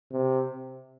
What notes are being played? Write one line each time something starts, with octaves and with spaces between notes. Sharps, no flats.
C3